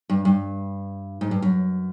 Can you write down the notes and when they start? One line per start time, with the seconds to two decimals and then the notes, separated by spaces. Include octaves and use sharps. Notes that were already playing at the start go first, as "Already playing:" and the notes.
0.10 G2
0.25 G2
1.21 G#2
1.31 G2
1.42 F#2